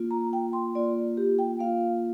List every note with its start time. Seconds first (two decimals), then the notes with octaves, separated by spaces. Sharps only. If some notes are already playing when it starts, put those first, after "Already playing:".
Already playing: A#3 F4
0.11 A#5
0.33 G5
0.53 C6
0.75 A#3 F4 D5
1.17 G4
1.39 G5
1.59 A#3 F4 F5